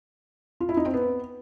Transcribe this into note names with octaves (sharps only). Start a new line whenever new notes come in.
F4
E4
D#4
C4
B3